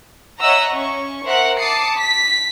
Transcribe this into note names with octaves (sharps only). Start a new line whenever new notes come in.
C#5 D#5 E5 F#5 A#5 E6
C#4 C#6
A#4 C5 E5 F#5
A5 D6 D#6 C7 C#7
B6